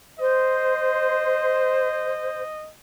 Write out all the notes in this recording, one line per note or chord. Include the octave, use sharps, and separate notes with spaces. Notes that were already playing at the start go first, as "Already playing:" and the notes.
C5 D#5